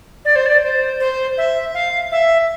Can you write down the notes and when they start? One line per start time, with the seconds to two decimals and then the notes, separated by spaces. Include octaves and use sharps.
0.25 D5
0.36 C5
0.46 D5
0.63 C5
1.00 C5
1.38 E5
1.74 F5
2.12 E5